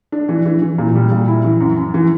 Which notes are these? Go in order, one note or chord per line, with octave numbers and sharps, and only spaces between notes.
D4
E3
E3
E3
A#2
G3
A#2
E4
E3
F#2
F#2
E3